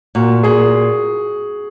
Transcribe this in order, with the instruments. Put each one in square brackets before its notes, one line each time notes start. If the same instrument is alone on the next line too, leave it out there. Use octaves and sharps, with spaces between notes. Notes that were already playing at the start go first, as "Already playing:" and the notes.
[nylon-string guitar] A#2 [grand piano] F#4
[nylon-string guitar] A#2 [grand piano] G#4